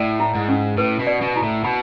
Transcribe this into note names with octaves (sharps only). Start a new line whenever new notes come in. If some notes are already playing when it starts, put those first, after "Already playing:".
Already playing: A2 D5
E4
G#2
C#4
A2 B4
B2
D5
B2
E4
A2
B2 B5